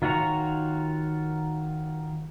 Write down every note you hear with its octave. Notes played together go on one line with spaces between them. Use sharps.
D#3 F4 F#4 C#5 A#5